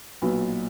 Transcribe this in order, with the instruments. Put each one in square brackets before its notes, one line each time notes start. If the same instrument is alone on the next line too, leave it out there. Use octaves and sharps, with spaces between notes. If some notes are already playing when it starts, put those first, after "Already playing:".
[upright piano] B1 A#2 F#3 B4